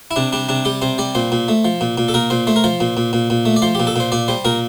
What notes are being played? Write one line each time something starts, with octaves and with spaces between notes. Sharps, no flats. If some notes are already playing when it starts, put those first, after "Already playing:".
E4
C3 D4
G3 D4
C3 D4
G3 G4
C3 C5
G3 D5
A#2 C5
A#2
A3
F3
A#2
A#2
A4
A#2 A#4
A#2 C5
A3 C5
A#4
F3 C5
A#2
A#2
A#2
A#2
A3
D5
F3 C5
A#2 G4
A4
A#2 C5
A#2 D5
G3 C5
A#2 A#4